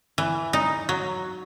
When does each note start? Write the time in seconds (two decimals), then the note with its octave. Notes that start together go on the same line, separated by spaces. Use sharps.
0.18 E3
0.53 D#4
0.89 F#3